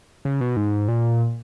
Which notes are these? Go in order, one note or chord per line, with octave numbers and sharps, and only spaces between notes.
C#3
B2
G#2
A#2